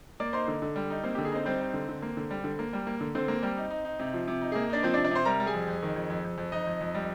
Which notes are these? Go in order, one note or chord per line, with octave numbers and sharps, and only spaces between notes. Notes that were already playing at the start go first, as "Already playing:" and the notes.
A#3 D5 D6
D#4 C5 C6
D3
D3
G3
D#4
A#3 C4 C5
D3 G4
G#4
C4 D#4 C5
G3 C4 C5
D#4
D3
D3
A#3
D3
G3
D3
A#3
G3
A#3
D3
D3 C4 C5
A#3
G3
D#4
D#4
D#4
C3
F3
C3
D#4
A#3 G#4
D4 D#4 D5
F3 C4 C5
D4 D5
C3
D4 D5
C3 C5 C6
G3 A#4 A#5
G3
G#4 G#5
F2
F2
D#3
F2
F2
F2
F2
F2 D#4 D#5
F2
F2
G3